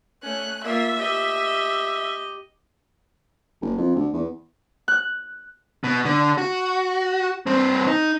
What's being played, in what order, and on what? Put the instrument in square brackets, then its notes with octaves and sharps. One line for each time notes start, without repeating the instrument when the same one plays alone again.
[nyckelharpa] A3 C#4 [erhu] F#6
[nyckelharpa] A#3 F4 [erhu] E5
[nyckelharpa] G4 D#5
[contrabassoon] F#1
F2
D2
E2
[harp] F#6
[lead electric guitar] B2
D3
F#4
G2 C4
D#4